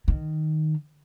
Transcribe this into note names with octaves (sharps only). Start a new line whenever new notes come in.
D#3